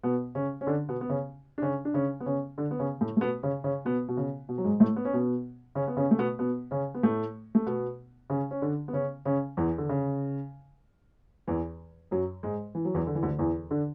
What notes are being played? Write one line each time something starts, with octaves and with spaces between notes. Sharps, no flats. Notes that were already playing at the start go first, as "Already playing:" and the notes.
B2 B3
C#3 C#4
C#4
D3 D4
B2 B3
B3
C#3 C#4
D4
C#3 C#4
D4
C#3 C#4
B3
C#3 C#4
D3 D4
B3
C#3 C#4
A2 A3
A3
B2 B3
C#3 C#4
C#3 C#4
B2 B3
B2
C#3
B2
F#3
G#2 G#3
A2 A3
B3
C#4
B2 B3
C#3 C#4
B3
C#3 C#4
A3
B2 B3
B2 B3
C#3 C#4
B3
A2 A3
A3
B2 B3
C#3 C#4
C#4
D3 D4
B3
C#3 C#4
C#3 C#4
E2 E3
D3
C#3
E2 E3
F#2 F#3
G#2 G#3
E3
F#3
E2 E3
D3
E3
D2 D3
E2 E3
D3 D4